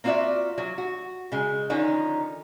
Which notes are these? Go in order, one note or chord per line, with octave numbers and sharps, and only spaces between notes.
A#3 C4 F4 F#4 D5 E5
F#3
F#4
C#3 G#3
D3 D#3 F3 C#4 D#4